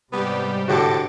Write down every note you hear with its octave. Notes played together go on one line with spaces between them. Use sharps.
G#2 C3 G3 B3 G4
A2 D3 F#4 G4 A4 D6 A6